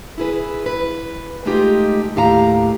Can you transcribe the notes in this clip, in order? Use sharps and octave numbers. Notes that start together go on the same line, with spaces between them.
E4 G#4 B4
B4
G#3 A3 D#4 F4 G4
D#2 A2 G4 F5 A5 A#5